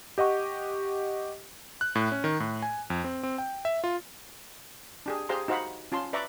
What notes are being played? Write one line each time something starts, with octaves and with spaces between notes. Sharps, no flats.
G4 D#5 F#5 C#6
F#6
A2
C#4
D#3
A2
G#5
F2
C4
C4
G5
E5
F4
D4 G4 G#4
G4 G#4 C5 F5 A#5 C6
D#4 F#4 C5 F5 F#5 B5
C#4 F4 A5 C6
B4 D5 E5 A#5 B5 C#6